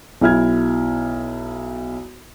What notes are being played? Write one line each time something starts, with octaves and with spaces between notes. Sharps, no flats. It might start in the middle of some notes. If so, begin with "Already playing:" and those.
B1 E4 F6 G#6